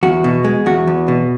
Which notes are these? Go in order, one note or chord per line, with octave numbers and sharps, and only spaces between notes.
E2 F#4
B2
G#3
E2 F#4
E2
B2